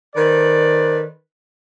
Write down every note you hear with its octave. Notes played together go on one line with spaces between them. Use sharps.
D#3 A4 B4 C5 D5